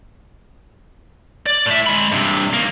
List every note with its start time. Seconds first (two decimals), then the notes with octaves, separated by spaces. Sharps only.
1.46 D5
1.66 A2 E5
1.87 G#3 B5
2.12 G2 C3
2.53 D#3 A#3